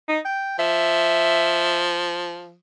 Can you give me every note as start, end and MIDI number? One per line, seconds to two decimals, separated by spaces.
0.09 0.19 63
0.25 0.56 79
0.59 2.55 53
0.59 1.85 76